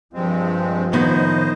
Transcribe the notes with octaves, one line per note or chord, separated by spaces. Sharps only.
G2 F3 G#3 C4
A2 D#3 B3 C5 D#5